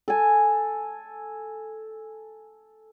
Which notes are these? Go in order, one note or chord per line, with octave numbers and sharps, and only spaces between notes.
A4 G#5